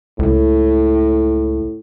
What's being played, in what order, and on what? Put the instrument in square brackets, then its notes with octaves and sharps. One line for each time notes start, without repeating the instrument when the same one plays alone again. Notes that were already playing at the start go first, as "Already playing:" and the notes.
[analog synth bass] C#2 [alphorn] A2